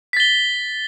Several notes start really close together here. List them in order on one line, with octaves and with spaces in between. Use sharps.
B6 A6 G7